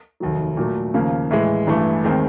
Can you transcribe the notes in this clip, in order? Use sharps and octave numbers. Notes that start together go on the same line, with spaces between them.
F1 D#2 D#3 F#3
A#2 F#3 A3
D#2 C#3 F3 A#3
A2 E3 G#3
A1 G2 E3 A3
D#2 D#3 G#3 C4